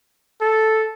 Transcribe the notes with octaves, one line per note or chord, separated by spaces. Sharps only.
A4